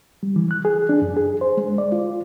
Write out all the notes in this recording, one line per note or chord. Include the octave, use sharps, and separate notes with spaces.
G3
E3
F#6
G#4
D4
F#2
G#4
C5
G#3
D5
F4